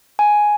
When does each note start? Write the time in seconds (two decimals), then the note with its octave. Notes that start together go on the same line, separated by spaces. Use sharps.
0.19 G#5